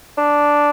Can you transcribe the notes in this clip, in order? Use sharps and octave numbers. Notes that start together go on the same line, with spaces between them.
D4